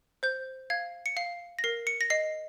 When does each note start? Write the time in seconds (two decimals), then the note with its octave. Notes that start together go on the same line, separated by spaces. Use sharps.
0.23 C5 G6
0.70 F5 G#6
1.06 C#7
1.17 F5 C7
1.59 A#6
1.64 A#4 C7
1.87 C#7
2.01 A#6
2.10 D#5 C7